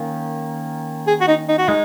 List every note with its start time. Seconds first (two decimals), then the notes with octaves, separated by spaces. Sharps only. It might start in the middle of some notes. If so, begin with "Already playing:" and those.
Already playing: D#3 A#3 C#4
1.07 G#4
1.21 F#4
1.28 D#4
1.49 D#4
1.58 F#4
1.68 G#3 D#4